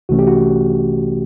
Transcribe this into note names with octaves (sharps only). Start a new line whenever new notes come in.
C2 C3 E3 A3 C#4 F#4
G4
F#4